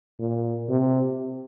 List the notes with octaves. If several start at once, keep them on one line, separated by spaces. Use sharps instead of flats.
A#2
C3